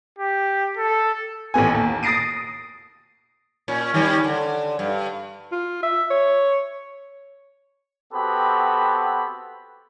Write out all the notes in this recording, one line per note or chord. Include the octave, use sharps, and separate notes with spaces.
G4
A4
A1 A3 B3 G#5
D#2
D#6 A6 A#6 C7 D7 D#7
A#2 C#4
D#3 G3 C#4
D3
G2
F4
E5
C#5
B3 C4 F#4 G4 A4 B5